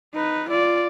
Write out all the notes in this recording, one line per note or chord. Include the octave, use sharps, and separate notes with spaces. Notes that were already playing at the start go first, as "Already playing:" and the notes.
D#4 B4
F4 D5